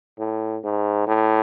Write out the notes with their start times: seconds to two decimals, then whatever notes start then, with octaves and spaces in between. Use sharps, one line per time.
0.19 A2
0.64 G#2
1.07 A2